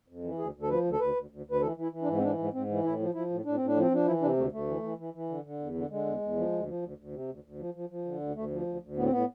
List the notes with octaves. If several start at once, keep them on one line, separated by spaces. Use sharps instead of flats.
F2
E3
D2 G#4
D2
A4
F3 B4
D2
A4
D2 B4
D2
D2
D2
B4
E3 A4
E3
E4
E3
D4
G#2
C4
E3 D4
G#2
G#2 C4
E3
A2 E4
F3
F3 E4
A2
A2 D4
A2 C4
D4
F3 C4
F3 D4
E3 E4
C3 D4
D2 A3
D2 A3
E3
E3
E3
E3
D3
D3
E2
D3
D3 G#3
E2
E2
F3
D2
F3
D2
D2
C3
D2
D2
F3
F3
F3
D3
D2
D2 A3
F3
D2
D2
A2 B3
C4
A2 B3